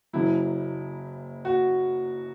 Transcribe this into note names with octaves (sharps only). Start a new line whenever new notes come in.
F#1 F#2 C#3 F#3 E4
F#4